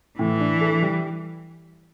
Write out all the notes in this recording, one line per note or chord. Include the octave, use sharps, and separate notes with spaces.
A2 E3
D4
A4
G3